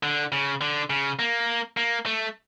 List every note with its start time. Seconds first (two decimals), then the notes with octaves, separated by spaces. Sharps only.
0.03 D3
0.32 C#3
0.61 D3
0.90 C#3
1.19 A#3
1.77 A#3
2.06 A3